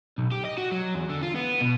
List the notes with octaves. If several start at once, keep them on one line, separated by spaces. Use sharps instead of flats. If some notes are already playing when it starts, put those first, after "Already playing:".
B1
G4
D#5
F#4
F#3
E2
D3
F4
B3
B2